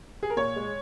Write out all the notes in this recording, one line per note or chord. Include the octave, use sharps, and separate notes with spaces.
G#4
A#4
A#2 C#5
G#3